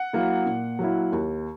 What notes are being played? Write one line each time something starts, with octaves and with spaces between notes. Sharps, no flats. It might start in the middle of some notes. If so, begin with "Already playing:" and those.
Already playing: F#5
F#3 A#3 E4
A#2
F#3 A#3 E4
D#2